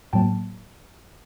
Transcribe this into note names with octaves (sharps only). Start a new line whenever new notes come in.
A2 F#3 A#3 G5 A5